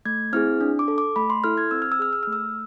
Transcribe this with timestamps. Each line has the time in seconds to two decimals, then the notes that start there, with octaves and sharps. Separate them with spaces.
0.05 A3 G#6
0.33 C4 E4 G#4 F6
0.61 D4
0.79 D6
0.88 A4
0.98 D6
1.16 A3 B5
1.30 C6
1.44 E4 A4 F6
1.58 G#6
1.71 C4 E6
1.82 F6
1.92 E6
1.99 G#4 F6
2.13 E6
2.23 A3 F6
2.33 E6